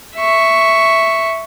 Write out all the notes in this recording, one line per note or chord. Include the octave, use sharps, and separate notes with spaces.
E5 C#6